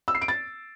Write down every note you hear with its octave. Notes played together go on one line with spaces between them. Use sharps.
E6
C7
D7
A6